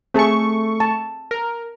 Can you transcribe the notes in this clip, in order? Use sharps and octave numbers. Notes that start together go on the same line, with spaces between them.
A3 C4 G#4 A5 C#6
A5
A#4